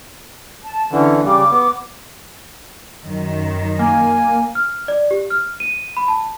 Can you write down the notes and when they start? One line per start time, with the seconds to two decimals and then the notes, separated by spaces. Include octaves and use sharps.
0.64 A5
0.92 D3 E3 C#4
1.25 C#3 G3 D6
1.51 B3
3.05 F#2 D#3
3.79 A#3 G#5
4.55 F6
4.88 D5
5.11 G4
5.30 F6
5.60 D#7
5.97 B5
6.08 A5